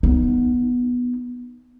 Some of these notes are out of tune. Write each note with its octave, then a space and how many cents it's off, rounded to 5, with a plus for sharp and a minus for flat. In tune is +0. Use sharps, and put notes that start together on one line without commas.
B3 -5 D#4 -15